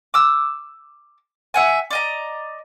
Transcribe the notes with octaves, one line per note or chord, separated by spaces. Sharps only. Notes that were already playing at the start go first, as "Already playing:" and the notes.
D6 E6
E5 F#5 G#5
D5 D#5 A#5